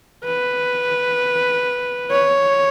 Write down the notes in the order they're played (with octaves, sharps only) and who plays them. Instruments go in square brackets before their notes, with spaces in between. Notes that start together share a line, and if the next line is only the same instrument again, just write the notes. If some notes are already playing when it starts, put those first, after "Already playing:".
[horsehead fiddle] B4
C#5